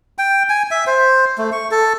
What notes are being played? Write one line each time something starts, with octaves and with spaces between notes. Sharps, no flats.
G5
G#5
E5
C5
A3
C#6
A4